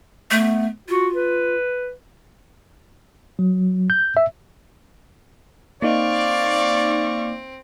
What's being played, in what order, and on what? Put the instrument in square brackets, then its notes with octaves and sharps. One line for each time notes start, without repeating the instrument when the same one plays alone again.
[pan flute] A3 [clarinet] B3
[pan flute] F4 [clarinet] F#4
[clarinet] B4
[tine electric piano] F#3
G6
E5
[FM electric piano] A#3 D#4 [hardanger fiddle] C4 [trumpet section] D5 [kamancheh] F5 C#6